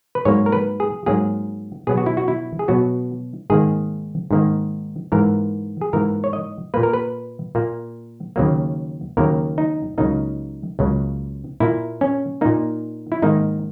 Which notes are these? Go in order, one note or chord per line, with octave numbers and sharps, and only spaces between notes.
B4
G#2 F#3 A#3 C#5
A#4
B4
G#4
G#2 F#3 A#3 G#4
B2 F#3 B3 G#4
F#4
E4
F#4
E4
G#4
B2 F#3 B3 F#4
G#2 D#3 A#3 G#4
G#2 D#3 A#3
G#2 E3 A#3 A#4
G#4
G#2 E3 A#3 A#4
C#5
D#5
A#2 A#3 B4
A#4
B4
A#2 A#3
D#2 C#3 F#3 A#3
D#2 C#3 F#3 A#3 A#4
D#4
C#2 C#3 F#3 A#3 D#4
C#2 C#3 F#3 A#3
A#2 A#3 E4
C#4
A#2 A#3 D#4
E4
G#2 D#3 A#3 D#4